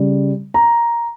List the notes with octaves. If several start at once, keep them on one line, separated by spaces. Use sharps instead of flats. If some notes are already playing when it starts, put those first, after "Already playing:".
Already playing: C#3 G3
A#5